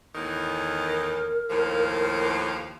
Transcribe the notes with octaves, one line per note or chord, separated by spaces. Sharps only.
E2 A2 D#3
A#4
D#2 A2 F3